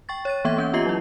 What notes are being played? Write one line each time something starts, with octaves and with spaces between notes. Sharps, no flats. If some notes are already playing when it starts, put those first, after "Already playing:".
G5 C#6 A6
C#5 A6 D#7
E3 A#3 B3 E5 G#6
A#3 C#4 G6
B3 F4 G4 D#5 E5 C7
F#3 E4